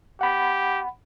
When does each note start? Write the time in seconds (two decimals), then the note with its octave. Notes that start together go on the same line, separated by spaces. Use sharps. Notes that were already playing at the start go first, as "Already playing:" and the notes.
0.21 G4 F#5 B5